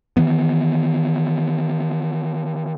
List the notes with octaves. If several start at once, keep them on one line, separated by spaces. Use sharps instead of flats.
D#3 E3 B3